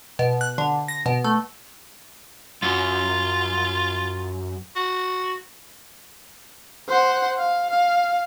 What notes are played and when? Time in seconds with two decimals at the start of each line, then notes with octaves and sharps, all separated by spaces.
0.19 B2
0.41 F#6
0.58 D3
0.88 A#6
1.06 B2
1.24 A3
2.63 F#2 F4
4.76 F#4
6.88 C5 F#5
7.38 F5
7.71 F5